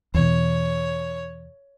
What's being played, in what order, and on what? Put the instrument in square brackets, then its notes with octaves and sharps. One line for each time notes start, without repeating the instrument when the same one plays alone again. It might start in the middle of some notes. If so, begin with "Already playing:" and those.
[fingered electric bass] E2 B2 [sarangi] C#5